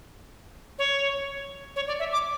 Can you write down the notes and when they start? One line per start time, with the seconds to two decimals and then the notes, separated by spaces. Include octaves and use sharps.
0.79 C#5
1.76 C#5
1.87 D5
1.99 E5
2.12 D6